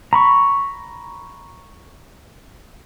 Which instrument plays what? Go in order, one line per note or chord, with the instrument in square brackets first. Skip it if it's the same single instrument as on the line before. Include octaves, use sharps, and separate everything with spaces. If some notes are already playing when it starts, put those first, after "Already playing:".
[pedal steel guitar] A#5 B5 C#6